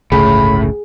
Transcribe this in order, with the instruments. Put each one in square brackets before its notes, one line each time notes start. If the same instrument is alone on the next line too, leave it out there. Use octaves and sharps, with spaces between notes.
[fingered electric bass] G1 C#2 C#3 [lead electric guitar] A2 [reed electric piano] G#4 [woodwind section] B5